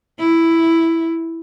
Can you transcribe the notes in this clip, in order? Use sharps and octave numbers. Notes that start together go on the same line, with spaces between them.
E4